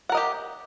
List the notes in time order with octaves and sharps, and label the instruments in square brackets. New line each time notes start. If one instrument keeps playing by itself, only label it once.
[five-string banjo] F#5
A#4
D#5
G4